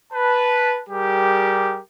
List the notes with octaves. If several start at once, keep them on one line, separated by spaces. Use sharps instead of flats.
B4 A5
G3 G4 G#4 A#4